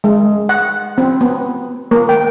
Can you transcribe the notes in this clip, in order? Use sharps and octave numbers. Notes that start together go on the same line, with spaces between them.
G#3
F#5
C4
B3
A#3
G5